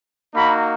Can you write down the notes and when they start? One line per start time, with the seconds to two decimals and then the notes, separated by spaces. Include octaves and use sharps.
0.34 A#3 D#4 F#4 B5